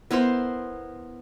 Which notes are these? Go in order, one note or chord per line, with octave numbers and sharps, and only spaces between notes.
B3 E4 A#4 C5